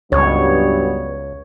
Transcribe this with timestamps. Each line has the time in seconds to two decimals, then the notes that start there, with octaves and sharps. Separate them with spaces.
0.12 C#2 G2 F#3 B3 C#5